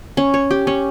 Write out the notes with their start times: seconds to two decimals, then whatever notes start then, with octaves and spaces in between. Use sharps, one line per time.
0.17 C#4
0.34 C#5
0.51 G4
0.67 C#4